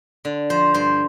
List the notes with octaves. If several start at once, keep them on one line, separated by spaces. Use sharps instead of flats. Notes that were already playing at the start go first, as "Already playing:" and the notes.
D3
F3 C5
G2 C5